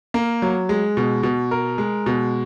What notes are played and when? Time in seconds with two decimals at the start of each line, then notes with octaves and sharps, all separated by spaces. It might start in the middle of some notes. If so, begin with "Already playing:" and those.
0.14 A#3
0.42 F#3
0.69 G#3
0.97 B2
1.23 B2
1.51 A#4
1.78 G#3
2.06 B2